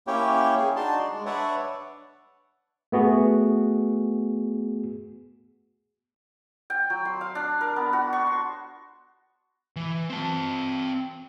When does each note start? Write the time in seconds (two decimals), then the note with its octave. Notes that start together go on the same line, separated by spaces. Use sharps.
0.07 A#3 C#4 E4 G4 C#5 G5
0.57 G#4
0.76 D4 D#4 F#4 A5 C6
0.99 D5
1.13 G#3
1.26 D4 B4 C#5 D5 E5 F#5
2.92 A3 B3 F#4 G#4
6.70 G5
6.90 F#3
7.05 C6
7.21 F5
7.35 D4
7.61 A#4
7.76 B3
7.93 F#4
8.13 C#6
8.27 C6
9.76 E3
10.10 C4 A5